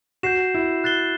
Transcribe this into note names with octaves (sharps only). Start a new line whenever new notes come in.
F#4 G6 C7 E7
E4
F#6 A6 C7 G7